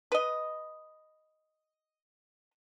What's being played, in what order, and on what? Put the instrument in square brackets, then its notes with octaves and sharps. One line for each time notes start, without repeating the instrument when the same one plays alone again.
[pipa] B4 D#5